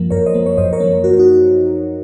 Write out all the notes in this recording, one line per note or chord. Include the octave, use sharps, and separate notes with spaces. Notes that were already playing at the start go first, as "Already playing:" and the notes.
Already playing: F#2 F3 A#3 A#4
F#2 A#4 C#5
C5 D#5
F3 A#3
C#5
F#2 C5 D#5
A#4 C#5
F3 A#3
F#2 F#4 A#4
D#4 F#4